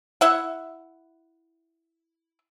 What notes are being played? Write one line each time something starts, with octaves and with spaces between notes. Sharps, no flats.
E4 E5 F#5